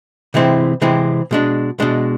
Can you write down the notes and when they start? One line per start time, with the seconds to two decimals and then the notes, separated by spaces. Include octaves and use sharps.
0.34 C3 E3 G#3 C4 E4
0.82 C3 E3 G#3 C4 E4
1.31 B2 G#3 D4
1.80 B2 G#3 D4